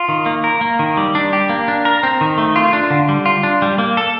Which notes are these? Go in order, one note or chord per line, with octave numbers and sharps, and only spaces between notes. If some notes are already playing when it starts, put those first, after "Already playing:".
Already playing: F4
D#3
A#3
A#4
A#3
D#3
G3
D4
G4
A#3
D4
A#4
C4
D#3
A3
F4
D4
D3
G3
F4
D4
G3
A#3
A4